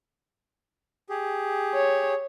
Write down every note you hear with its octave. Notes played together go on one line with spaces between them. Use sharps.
G4 G#4
C#5